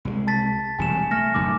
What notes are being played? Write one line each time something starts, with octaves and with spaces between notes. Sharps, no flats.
C2 E3 G#3
A5 A6 B6
E1 C2 C3 G#5 E7
A3 F6 A#6
F#1 B1 F#2 D6